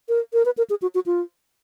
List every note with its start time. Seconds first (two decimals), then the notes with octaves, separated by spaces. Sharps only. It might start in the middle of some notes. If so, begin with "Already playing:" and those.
0.09 A#4
0.33 A#4
0.45 B4
0.58 A#4
0.70 G#4
0.82 F#4
0.95 F#4
1.06 F4